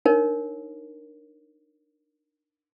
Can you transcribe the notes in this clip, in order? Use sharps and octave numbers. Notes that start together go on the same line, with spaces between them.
D4 D#4 A#4 C#5